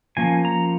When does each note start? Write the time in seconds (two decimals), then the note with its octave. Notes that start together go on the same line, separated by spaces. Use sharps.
0.17 F3 A#3 C#4 G#5
0.45 A#5